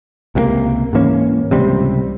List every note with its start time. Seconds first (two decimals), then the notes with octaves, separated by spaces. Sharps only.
0.35 C#2 C3 E3 A#3
0.93 G#2 E3 A#3 C#4
1.51 C#2 C3 G3 C4